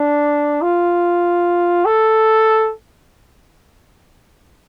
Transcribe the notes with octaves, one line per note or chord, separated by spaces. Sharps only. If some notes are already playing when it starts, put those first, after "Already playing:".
Already playing: D4
F4
A4